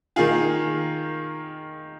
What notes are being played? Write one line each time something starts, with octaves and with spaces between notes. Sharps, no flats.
D#3 A#3 F4 G#4